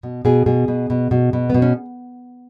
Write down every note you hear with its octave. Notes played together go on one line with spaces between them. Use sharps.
B2
B2 G#4
B2 G#4
B2
B2
B2
B2
B2 B3
C#4